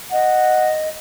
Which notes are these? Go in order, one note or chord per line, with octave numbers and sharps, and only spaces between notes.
D#5 F#5